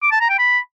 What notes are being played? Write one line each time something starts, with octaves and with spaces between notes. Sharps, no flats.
D6
A5
A#5
G5
B5